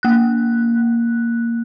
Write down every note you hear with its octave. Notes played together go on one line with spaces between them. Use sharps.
A#3 F#6